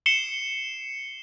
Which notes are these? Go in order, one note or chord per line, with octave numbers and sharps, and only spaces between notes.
C7 C#7 E7 G7